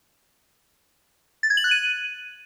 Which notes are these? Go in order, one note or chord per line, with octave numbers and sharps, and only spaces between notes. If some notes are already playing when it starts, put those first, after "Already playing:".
A6
G#6
F#7
F#6
D#7